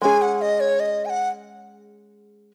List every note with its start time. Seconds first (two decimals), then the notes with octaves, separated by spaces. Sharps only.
0.02 G#3 C#4 G#4 G#5
0.22 F#5
0.41 D#5
0.60 C#5
0.80 D#5
1.06 G#5
1.10 F#5